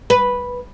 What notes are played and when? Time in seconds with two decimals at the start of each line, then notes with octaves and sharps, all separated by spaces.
0.10 B4